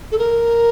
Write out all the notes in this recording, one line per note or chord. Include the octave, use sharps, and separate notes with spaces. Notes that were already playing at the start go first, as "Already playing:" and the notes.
A4
A#4